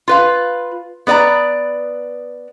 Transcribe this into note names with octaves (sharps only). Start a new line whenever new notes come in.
F4 B4 F5
B3 B4 D5 F#5 A#5